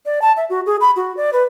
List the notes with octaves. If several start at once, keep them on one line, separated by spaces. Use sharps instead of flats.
D5
A5
E5
F#4
G#4
B5
F#4
D5
B4